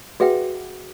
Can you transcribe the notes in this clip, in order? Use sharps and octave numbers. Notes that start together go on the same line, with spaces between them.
F#4 G#4 B4 E5 F#5 G5